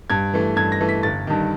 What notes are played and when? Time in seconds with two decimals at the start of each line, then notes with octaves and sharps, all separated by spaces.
0.10 G2 G#6
0.33 E3 A3
0.56 G2 G#6
0.72 A#6
0.80 E3 A3
0.89 B6
1.03 G1 A6
1.27 G2 D#3